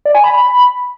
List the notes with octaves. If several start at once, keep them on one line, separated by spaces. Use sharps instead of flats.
D5
G#5
B5